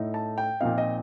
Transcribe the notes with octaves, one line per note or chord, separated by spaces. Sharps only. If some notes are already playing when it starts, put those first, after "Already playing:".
Already playing: A2 A3 D#4
A5
G5
A#2 F3 C4 D#4 F5
D#5